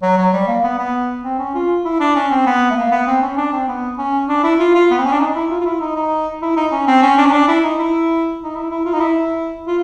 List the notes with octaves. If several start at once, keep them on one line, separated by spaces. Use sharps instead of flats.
F#3
F#3
G3
A#3
B3
B3
C4
C#4
F4
E4
D4
C#4
C4
B3
A3
A#3
B3
C4
C#4
D4
C4
B3
C#4
D4
E4
F4
F4
B3
C4
C#4
D4
D#4
E4
F4
F4
E4
D#4
D#4
E4
D#4
C#4
C4
C#4
D4
C#4
D4
E4
D#4
E4
D#4
E4
E4
F4
D#4
E4
F4